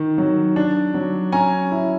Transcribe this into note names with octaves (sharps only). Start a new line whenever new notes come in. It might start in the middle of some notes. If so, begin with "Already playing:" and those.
Already playing: D#3
F#3
D4
F#3
C#4 G#5 A#5
E4